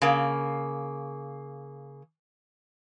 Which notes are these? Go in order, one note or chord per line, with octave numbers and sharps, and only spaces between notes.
C#3 A#3